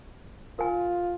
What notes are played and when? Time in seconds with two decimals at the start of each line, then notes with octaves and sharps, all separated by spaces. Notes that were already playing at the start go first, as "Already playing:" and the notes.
0.59 F4 A#4 G#5